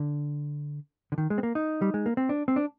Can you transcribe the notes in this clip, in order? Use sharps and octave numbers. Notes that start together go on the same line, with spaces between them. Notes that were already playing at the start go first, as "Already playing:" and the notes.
Already playing: D3
D3
D#3
G#3
C4
A#3
D#4
G3
G#3
A#3
C4
D4
C4
D4